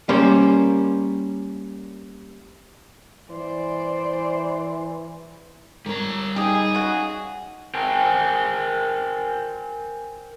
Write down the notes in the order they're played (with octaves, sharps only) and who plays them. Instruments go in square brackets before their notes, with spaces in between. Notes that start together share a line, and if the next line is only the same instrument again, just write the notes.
[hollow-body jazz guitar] G3 A#3 C#4 C5
[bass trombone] E3 [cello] C5 D5
[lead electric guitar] G3 A#5 [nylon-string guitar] A#4 C#5
[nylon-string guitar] D#4 F5 [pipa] G4 D#5 [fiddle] G#4
[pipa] C#3 F#4
[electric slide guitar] A#4 C5 G5 G#5